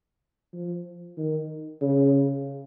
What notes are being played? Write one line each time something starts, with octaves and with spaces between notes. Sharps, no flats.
F3
D#3
C#3